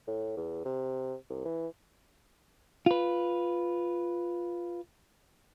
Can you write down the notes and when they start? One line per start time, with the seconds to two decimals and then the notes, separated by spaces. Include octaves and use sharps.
0.08 A2
0.37 E2
0.65 C3
1.29 C2
1.45 E3
2.86 F4 B4